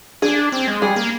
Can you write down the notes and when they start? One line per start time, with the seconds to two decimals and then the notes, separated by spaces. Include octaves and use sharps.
0.22 D4 G#4
0.52 C4
0.67 G#3
0.82 G3 G#4
0.96 A#3